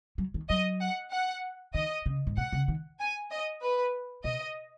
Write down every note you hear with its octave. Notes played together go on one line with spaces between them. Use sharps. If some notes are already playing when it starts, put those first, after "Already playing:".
F#3
D#3
F#3 D#5
F#5
F#5
D#3 D#5
C#3
G#2
B2 F#5
C#3
D#3
G#5
D#5
B4
B2 D#5